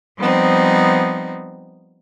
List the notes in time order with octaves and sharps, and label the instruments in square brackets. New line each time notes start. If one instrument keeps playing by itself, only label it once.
[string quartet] F3 G3 B3 C4 D#4